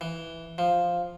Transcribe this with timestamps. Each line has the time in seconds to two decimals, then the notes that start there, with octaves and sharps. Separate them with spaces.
0.01 E3
0.58 F3